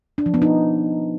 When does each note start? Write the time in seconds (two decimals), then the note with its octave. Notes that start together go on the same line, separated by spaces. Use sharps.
0.18 D4
0.26 F3
0.34 B3
0.42 D#4